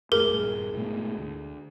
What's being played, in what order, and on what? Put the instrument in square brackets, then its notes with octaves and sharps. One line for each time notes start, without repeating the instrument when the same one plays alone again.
[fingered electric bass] F2 A2 A3 [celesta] G#4 [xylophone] A#4
[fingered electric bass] A#1 G2
G#2 B2 A3
D2